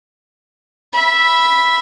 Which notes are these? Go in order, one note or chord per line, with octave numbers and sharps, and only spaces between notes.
E5 B5